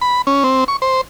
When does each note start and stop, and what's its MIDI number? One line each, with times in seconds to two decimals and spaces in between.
0.01 0.22 83
0.27 0.44 61
0.44 0.64 60
0.68 0.77 85
0.82 1.01 72